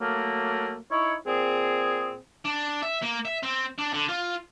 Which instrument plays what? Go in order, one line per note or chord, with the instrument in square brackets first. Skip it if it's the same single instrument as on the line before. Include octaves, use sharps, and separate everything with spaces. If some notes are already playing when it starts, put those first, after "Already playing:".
[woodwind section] F#3 A3 A#3
D#4 E4 C#5
A#2 C4 G#4
[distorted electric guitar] D4
E5
A#3
E5
C4
D4
D3
F4